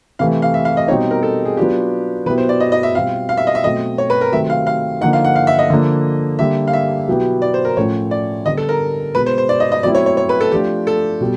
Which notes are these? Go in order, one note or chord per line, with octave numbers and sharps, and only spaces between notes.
C3 E3 A3 F5
F5
E5
F5
D#5
B2 G3 C4 D#4 C#5
A#4
A4
G#4
F#3 B3 D4 F4 G4
B2 F#3 B3 E4 G4 B4
C5
D5
D#5
D#5
E5
B2 G3 C4 F4 F5
F5
E5
D#5
E5
B2 F#3 A3 C4 D#5
C#5
B4
A#4
C3 D#3 F#3 A3 C4 E5
F5
F5
D3 F3 A#3 D#4 F#5
F5
F#5
F5
E5
D#5
D3 F3 A#3
D3 G3 A#3 E5
F5
E5
B2 F#3 B3 E4 G4
D5
C5
A#4
A2 F3 A3 C#4 F4 C#5
D5
D3 G3 B3 D#5
A4
A#4
B2 G#3 B3 B4
C5
C5
D5
D#5
D#5
B2 F#3 A3 C4 E4 D5
C#5
C#5
C#5
B4
A4
F3 A3 D4 F4 G4
A4
B2 G3